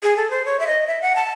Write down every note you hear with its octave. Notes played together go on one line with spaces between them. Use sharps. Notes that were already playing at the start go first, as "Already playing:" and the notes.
G#4
A4
C5
C#5
E5
D#5
E5
F#5
A5